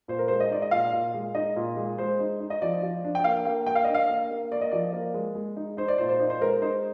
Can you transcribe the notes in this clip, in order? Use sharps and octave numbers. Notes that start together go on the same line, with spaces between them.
A#2 C5
A#4
G#3 C5
D#5
D#4 D5
D#5
A#2 F5
A#2
G#3
D#4 D#5
A#2
G#3
G#3 C5
D#4
D#4
D#5
F3 D5
F3
D4
G5
A#3 F5
A#3 G5
A#3 G5
F5
D4 D#5
F5
A#3
A#3
A#3 D5
D#5
F3 D5
A#3
G#3
G#3
D#4
D#4 C5
D5
A#2 C5
C5
D#4
C5
G#3 A#4
D#4 C5